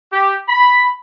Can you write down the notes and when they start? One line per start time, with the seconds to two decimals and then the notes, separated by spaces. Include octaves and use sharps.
0.10 G4
0.47 B5